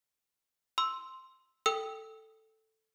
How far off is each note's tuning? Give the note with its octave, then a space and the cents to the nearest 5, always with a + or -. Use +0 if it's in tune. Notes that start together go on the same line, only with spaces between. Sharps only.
C6 +0 E6 +0
A4 +5 G5 +0 E6 -25